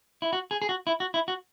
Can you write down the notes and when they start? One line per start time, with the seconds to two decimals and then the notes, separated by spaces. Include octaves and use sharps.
0.22 E4
0.33 F#4
0.51 G#4
0.62 G#4
0.69 F#4
0.87 E4
1.00 F#4
1.14 E4
1.28 F#4